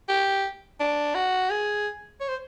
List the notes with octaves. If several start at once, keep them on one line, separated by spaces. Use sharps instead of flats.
G4
D4
F#4
G#4
C#5
C5